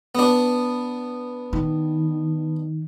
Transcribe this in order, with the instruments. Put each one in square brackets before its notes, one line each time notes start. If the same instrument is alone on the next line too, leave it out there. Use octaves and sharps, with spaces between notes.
[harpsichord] B3 D4
[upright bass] D#3